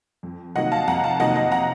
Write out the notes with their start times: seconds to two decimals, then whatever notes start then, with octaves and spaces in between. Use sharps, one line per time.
0.23 F2
0.55 C3 D#3 F#3 A#3 D#5 F#5
0.72 F5 A5
0.88 F2 F#5 A#5
1.04 F5 A5
1.20 C3 D#3 F#3 A#3 D#5 F#5
1.36 D#5 F#5
1.52 F#5 A#5